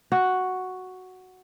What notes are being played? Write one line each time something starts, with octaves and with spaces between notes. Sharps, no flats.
F#4